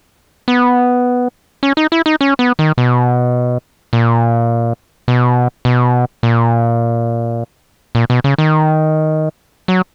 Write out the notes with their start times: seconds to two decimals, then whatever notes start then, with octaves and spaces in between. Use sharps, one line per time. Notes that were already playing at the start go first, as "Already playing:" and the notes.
0.48 B3
1.63 C#4
1.77 D#4
1.92 E4
2.06 D#4
2.21 C#4
2.39 B3
2.59 D#3
2.78 B2
3.93 A#2
5.08 B2
5.65 B2
6.23 A#2
7.95 A#2
8.10 B2
8.24 C#3
8.38 D#3
9.68 F#3